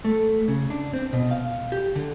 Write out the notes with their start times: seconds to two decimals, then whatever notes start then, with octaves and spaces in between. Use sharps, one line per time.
0.05 A3
0.48 C#3
0.70 D4
0.93 C4
1.13 B2
1.31 F5
1.72 G4
1.95 D3